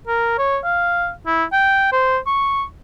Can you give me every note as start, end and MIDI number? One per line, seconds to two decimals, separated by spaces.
0.07 0.34 70
0.39 0.58 73
0.64 1.10 77
1.27 1.44 64
1.53 1.90 79
1.92 2.18 72
2.27 2.63 85